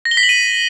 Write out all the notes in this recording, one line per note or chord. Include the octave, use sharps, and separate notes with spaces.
A#6
G7
B6
F#7
D#7